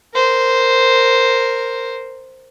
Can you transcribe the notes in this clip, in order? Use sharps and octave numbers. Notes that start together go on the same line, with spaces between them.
A#4 C5